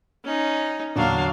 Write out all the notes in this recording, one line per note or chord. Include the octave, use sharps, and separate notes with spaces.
C#4 D#4
E2 A#2 D3 F#3 D4 F5